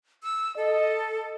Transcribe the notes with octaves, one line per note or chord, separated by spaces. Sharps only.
E6
A4 D#5